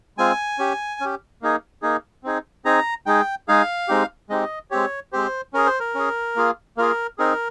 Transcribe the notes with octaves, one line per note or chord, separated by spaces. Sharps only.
G#3 C4 F4 G#5
C#4 G4
C#4 G4
A#3 D#4 G#4
A#3 D#4 G#4
C4 D#4 G#4
C4 D#4 G#4 A#5
G#3 D#4 G#4 G5
G#3 D#4 G#4 F5
G#3 C4 D#4 G4
G#3 C4 D#4 G4 D#5
G#3 C4 G4 C#5
G#3 C4 G4 C5
C#4 G#4 A#4
C5
A#4
C#4 G#4
A#3 F4 G#4
A#3 F4 G#4 A#4
C4 D#4 G#4 A#4